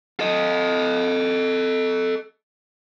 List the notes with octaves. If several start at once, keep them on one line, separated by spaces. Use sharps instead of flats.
A4 D#5